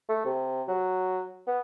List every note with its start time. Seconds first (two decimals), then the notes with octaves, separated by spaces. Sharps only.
0.09 A3
0.25 C3
0.68 F#3
1.47 B3